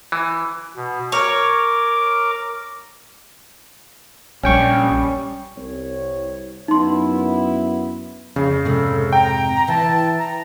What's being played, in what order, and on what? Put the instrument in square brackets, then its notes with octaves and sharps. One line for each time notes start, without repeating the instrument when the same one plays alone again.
[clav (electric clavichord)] E3
[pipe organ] B2
[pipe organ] A#4 D6 [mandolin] C#5
[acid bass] A#1 [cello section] G3 [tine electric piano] C#4 G5 C#6
[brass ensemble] C2 C#5
[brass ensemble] F#2 B3 E4 [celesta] D#4 C6
[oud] F2 [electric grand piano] C#3
[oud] F2 G#2 C3 [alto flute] A4
[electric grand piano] G5 [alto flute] A#5
[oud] E3 [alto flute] A5
[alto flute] A#5